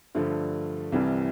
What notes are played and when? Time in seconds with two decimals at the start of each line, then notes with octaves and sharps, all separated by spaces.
0.15 G2 D3 F3 A3
0.92 C2 C3 E3 G3